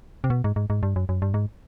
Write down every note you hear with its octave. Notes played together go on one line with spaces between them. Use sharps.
C3
B2
G#2
G#2
G#2
G2
F#2
F#2
G2
G#2